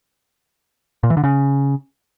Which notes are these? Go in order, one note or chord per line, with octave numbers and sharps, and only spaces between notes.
A#2
E3
D3
C#3